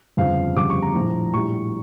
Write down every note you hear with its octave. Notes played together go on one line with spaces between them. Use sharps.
G1 F2 C#3 F3 F5
G1 F2 C#3 G3 D6
C#6
A#5
A#1 A2 F3
A#1 A2 G3 C#6